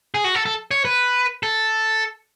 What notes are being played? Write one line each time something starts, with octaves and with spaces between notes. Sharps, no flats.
G#4
F#4
A4
A4
C#5
B4
A4